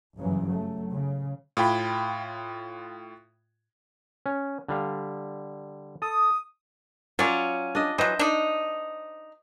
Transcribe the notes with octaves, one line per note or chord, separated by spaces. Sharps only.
F#1 G2 C#3 E3 F#3
F#3 A3
C#3
A2 F4 G5 B5
C#4
D3 G3 F5
A4 D#6
F#3 C#4 F4 D5 F5
D4 D#5
E3 F#3 C5 D#5 E5
D4 D#4